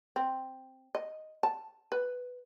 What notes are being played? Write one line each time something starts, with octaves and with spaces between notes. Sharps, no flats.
C4
D#5
A5
B4